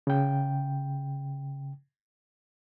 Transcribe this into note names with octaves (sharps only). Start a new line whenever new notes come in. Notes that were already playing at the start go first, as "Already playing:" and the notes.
C#3 G5